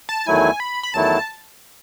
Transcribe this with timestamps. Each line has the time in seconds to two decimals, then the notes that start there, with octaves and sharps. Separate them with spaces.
0.09 A5
0.27 E2 D#3 F#3 A3 E4 G#5
0.60 B5
0.83 B5
0.94 E2 D#3 F#3 A3 E4 A5